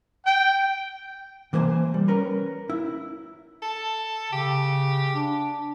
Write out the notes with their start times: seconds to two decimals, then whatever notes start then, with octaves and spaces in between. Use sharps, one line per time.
0.25 G5
1.53 C3 E3 A#3 C5 G#5
1.94 G3
2.08 C#4 A#4 B4
2.70 E4
3.62 A4
4.33 C#3 G4
5.15 D4